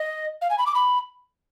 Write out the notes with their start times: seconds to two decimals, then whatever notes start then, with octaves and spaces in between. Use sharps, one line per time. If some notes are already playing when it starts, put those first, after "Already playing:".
Already playing: D#5
0.42 F5
0.50 G#5
0.58 B5
0.66 D6
0.75 B5